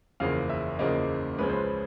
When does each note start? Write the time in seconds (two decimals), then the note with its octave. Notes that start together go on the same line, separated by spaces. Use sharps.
0.20 F#1 E2 C#3 F3 A#3 F5
0.49 E5
0.79 F#1 E2 C#3 F3 A#3 D#5
1.38 C#2 C#3 F3 G#3 C#4 B4
1.49 C5
1.58 B4